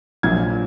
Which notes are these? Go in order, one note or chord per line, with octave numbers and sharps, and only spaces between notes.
A#1 A#2 F#3 G#6